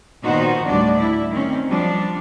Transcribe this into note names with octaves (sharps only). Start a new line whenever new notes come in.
A#2 D#3 B3 D#4 F#4 C5
D2 A2 G3 D4 D5
E4
D#3 C4 C#4
F3 G3 D4